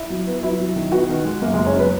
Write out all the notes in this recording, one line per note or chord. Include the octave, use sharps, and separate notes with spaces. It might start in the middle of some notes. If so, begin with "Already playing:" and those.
Already playing: E4 E5
F#3
B3
F#3 E4 E5
F#3
D#3
B3 F#4 F#5
D#3
G#3
F#2 A#3 A#4
F#1 G#3 G#4
C#4 C#5
F#3 B3 B4